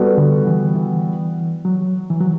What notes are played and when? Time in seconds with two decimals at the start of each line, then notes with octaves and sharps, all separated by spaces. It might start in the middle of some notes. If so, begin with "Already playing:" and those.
Already playing: G3 B3 F#4 A4
0.17 D3
0.47 E3
0.76 E3
1.65 F#3
2.10 E3
2.21 F#3